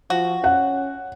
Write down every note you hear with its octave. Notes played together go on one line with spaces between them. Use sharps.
F3 F#4
C#4 F#5